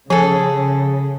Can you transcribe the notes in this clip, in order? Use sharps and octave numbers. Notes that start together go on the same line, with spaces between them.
C#3 F3 G#4 A4